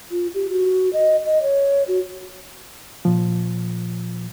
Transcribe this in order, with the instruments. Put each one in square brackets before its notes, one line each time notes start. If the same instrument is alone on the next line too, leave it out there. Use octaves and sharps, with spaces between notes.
[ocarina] F4
G4
F#4
D#5
D#5
C#5
F#4
[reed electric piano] A#2 F3